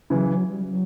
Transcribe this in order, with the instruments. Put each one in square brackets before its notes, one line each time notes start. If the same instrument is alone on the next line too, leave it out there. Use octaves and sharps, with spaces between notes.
[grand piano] C#3 E3 [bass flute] F#3
[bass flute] F#3
G3
F#3